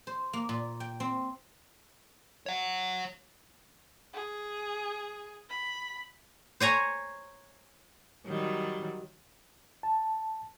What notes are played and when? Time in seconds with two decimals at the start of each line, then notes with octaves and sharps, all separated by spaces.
0.07 C5
0.33 A#3
0.49 A#2
0.80 G5
1.00 C4
2.46 C#5 F#5
4.14 G#4
5.50 B5
6.60 C5 C#5 G#5 A#5
8.26 D#3 F#3 G3
9.83 A5